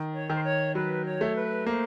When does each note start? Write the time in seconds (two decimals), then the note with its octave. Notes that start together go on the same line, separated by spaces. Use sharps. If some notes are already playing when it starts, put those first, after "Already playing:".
Already playing: D#3
0.13 C#5
0.30 D#3
0.36 C5
0.44 C#5
0.75 F#3 B4
1.05 C#5
1.21 A3
1.36 B4
1.66 A#3 C5